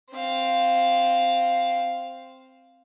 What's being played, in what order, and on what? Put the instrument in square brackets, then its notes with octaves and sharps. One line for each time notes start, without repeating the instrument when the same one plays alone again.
[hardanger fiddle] C4 F5